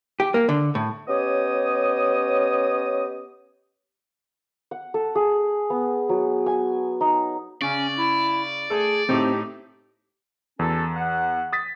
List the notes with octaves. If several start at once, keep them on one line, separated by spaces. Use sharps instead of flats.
G4
A#3
D3
A2
B3 C#4 G4 C#5 D#5 D#6
F#5
A4
G#4
B3
F#3
G#5
D#4
C#3 C#4 D5
E4
A3 G#4 A4
A2 C4 D#4 G4
E2 C#4 F#4 A4
F#5
D#6 A6 B6